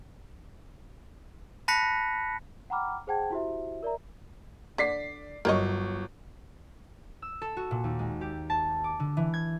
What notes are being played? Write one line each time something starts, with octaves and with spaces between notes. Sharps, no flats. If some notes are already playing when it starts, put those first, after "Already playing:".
A5 B5 F#6 A#6 B6 C#7
F#5 G5 A#5 B5 D6 F6
G#4 C5 F#5 G5 A5 G#6
E4 F#4 G4 C5 E5
A#4 D5 E5 A#5
D3 D5 B6 C7
G1 F#3 A#4 C#5 D#5 C#6
E6
A4
F#4
A#2
D#2
G#3
G4
A5
D6
D3
E3
G#6